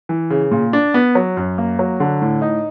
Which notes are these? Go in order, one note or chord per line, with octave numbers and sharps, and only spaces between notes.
E3
C#3
A#2
D4
B3
F#3
F#2
A#3
F#3
D3
A2
D#4